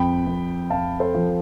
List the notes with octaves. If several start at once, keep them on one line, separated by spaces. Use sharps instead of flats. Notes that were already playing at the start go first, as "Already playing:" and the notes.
Already playing: F2 G5 B5
F2
F2 F5 A5
A4 C5
F3